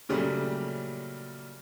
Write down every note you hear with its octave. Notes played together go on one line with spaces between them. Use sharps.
A#2 C#3 F#3 G3 A3